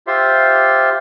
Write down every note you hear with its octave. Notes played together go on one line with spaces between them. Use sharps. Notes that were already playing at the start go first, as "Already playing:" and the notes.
F4 G4 C5 E5